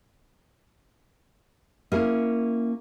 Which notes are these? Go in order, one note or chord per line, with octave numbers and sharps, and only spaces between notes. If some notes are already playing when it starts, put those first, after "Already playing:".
A#3 C#4 E4 G#4 A#4